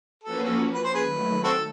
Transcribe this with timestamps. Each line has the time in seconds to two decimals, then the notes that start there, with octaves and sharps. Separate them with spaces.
0.24 F3 A#3 C#4 F#4 A4 B4
0.44 A4
0.74 B4
0.84 C5
0.94 G#4 B4
1.04 D#3 F#3 A3
1.44 C4 F#4 A4